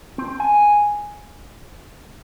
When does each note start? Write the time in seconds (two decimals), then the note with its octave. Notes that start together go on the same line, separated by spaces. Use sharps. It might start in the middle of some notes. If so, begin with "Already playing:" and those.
0.18 C4
0.40 G#5